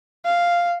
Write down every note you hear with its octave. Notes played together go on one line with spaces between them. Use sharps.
F5